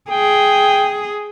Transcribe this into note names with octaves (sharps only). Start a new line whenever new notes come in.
G#4 G5